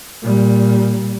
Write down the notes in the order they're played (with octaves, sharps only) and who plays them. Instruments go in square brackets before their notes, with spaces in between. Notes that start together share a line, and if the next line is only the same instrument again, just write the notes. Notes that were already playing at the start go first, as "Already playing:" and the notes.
[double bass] A#2 G3